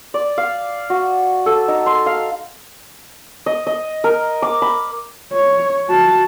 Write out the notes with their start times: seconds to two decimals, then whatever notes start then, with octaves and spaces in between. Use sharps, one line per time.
0.14 D5
0.38 F5
0.90 F#4
1.46 A4
1.68 D#4
1.86 C6
2.06 F5
3.46 D#5
3.67 D#5
4.04 A#4
4.42 D6
4.62 B5
5.33 C#5
5.88 F#4 A5